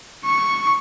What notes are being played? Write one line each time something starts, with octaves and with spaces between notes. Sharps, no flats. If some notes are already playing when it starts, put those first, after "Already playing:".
C#6